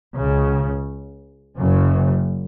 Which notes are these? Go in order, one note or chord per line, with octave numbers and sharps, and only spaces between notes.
C#2 C#3
F#1 F#2 C#3